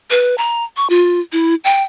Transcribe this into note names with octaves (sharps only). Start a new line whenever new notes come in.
B4
A#5
C#6
F4
E4
G5